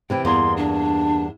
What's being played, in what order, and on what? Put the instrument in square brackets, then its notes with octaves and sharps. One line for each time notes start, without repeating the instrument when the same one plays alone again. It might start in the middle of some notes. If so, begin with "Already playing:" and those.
[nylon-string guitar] C3 E3 E4 [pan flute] G5
[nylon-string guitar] E2 G2 A#3 [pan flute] C6
[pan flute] D4